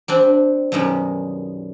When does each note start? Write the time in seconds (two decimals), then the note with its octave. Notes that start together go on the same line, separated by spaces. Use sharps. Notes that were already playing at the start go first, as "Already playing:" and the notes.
0.08 G3 C4 D4
0.72 F#2 B2 D#3 G3 G#3